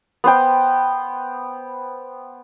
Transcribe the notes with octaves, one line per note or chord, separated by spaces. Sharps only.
B3 C5 G5